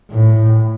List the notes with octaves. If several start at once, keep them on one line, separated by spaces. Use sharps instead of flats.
A2